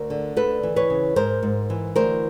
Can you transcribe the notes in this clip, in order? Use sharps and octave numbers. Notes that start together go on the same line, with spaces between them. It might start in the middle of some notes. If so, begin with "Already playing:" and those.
Already playing: D2 A#4
D3
D2 A4 B4
E3
B4 C#5
C#3
G#2 A#4 C5
G#2
E3
D2 A#4 C5